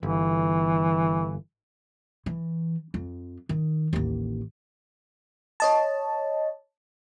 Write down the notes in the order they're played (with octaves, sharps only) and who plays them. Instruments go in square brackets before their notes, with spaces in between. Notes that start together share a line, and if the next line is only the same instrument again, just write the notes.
[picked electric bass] G1 [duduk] E3
[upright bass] E3
F2
D#3
A1 D#2
[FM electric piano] C#5 D#5 A5